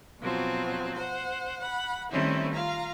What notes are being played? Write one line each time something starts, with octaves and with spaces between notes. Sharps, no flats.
B2 F3 F#3 C4
C5 F#5
F#5 B5
D#3 G3 A3 C4 C#4 E4
F4 F5 A#5